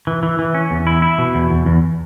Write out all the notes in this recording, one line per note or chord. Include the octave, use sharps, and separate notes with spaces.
E3
E3
E3
C#4
E2
E4
E4
B2
E2
E2
E2